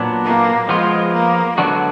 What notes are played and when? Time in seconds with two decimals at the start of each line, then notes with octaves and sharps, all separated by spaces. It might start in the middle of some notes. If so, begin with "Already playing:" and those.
Already playing: A#2 F#3 B3 D4
0.24 A#3
0.68 F3 G#3 B3 F4
1.13 A#3
1.58 D3 F#3 G#3 B3 D4 F#4